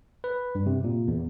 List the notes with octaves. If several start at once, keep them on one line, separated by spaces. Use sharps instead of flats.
B4
G2
C3
A#2
E2